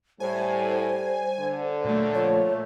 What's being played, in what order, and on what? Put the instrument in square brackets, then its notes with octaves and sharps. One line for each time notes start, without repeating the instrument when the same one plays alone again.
[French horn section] A2 [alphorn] G3 [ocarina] C5 [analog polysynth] G#5
[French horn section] D3
[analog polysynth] A#2 A3 [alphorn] F#3
[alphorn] F3 [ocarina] C#5